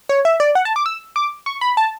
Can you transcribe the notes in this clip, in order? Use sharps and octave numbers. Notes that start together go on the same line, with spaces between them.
C#5
E5
D5
F#5
A5
D6
E6
D6
C#6
B5
A5